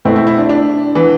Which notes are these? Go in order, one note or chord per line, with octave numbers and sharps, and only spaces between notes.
B2 A3 C4 E4
E4
E4
D4
D4
E3 B3